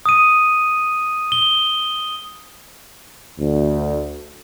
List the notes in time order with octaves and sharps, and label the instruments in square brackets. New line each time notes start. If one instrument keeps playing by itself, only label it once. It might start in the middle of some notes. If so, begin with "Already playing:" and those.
[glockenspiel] D#6 D#7
G7
[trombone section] D2